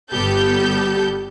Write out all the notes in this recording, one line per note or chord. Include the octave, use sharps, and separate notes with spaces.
G1 G3 B3 G4 A4 G6